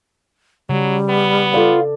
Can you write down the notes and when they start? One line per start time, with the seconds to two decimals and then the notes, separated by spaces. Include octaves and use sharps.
0.69 C#3 F#3 G3
1.09 B3
1.54 F4 A4 D5